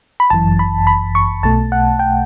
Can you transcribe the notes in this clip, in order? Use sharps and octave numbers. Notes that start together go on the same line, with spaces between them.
B5
G1 F#2 E3 A5
B5
B5
C#6
B1 B2 A3 A5
F#5
G5